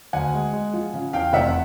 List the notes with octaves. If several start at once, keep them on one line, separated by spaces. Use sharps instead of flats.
D2 F#5 G#5
G#3
G#3
F3
C#3
E2 F5 G5
F1 E5 F#5